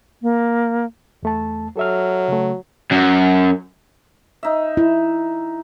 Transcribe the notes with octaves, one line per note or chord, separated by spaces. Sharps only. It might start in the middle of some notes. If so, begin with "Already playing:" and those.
A#3
E2 A3 A5
F#3 A4 E5 F6
C#3 A3
F#2
D#4 E5
E4